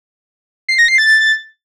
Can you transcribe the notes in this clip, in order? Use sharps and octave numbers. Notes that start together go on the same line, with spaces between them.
C7
A#6
C7
A6